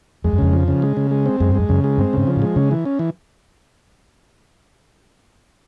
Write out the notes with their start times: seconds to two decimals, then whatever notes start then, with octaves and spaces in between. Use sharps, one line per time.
0.24 F2 G#3
0.33 F#2
0.38 F2 C#3
0.53 F3
0.68 C#3
0.82 G#3
0.97 C#3
1.11 G#3
1.26 C4
1.40 F#2 G#3
1.49 G2
1.55 F#2 G#3
1.69 F#2 C#3
1.84 G#3
1.98 G2 C4
2.13 G#2 C#3
2.27 F3
2.37 A2
2.42 G#3
2.56 C#3 C#4
2.71 E3
2.85 C#4
2.99 E3